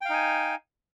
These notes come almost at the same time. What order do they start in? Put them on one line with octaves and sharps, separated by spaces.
G5 F5 D#4 G#5